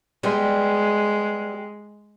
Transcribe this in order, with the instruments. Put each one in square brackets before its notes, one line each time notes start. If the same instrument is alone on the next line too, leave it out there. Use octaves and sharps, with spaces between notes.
[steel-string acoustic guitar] G3 B3 G4 [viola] G#3